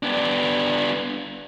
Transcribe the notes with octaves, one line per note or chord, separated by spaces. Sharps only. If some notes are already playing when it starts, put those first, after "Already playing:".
B3 D4